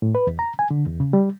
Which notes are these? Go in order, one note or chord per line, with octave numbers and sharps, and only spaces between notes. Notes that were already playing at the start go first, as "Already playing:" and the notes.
A2
B4
E2
A#5
G#5
D3
E2
C#3
G3